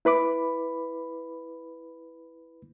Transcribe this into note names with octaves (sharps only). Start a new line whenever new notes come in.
E4 B4 B5 D6